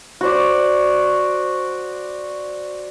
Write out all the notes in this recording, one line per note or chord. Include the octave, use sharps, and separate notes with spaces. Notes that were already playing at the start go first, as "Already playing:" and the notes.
F#4 C5 D5